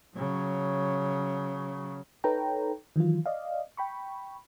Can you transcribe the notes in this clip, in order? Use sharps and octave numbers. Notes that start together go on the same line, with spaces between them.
C#3 F#3
D#4 A4 B4 C#5 G5 A#5
D#3 E3 F#3 F4
D5 D#5 F5
G5 B5 C#6